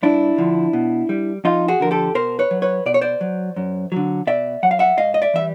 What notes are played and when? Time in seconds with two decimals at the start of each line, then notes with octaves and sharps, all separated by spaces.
0.03 G2 D4 E4
0.38 D3 F3
0.73 B2
1.09 G3
1.44 F2 D#4 F4
1.68 F#4 G#4
1.80 D3 F3 A#4
1.91 G4 A4
2.15 B2 A#4 C5
2.39 B4 C#5
2.51 F#3
2.62 B4 C#5
2.86 B2 D5
2.94 C#5
3.01 C5 D5
3.21 F#3
3.56 F#2
3.92 D3 F#3
4.27 B2 D5 E5
4.63 F#3 F#5
4.71 F5
4.79 E5 F#5
4.98 G#2 D#5 F5
5.14 D#5
5.22 D5 E5
5.34 E3 G3 E5